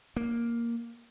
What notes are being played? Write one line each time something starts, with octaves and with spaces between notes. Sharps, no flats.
A#3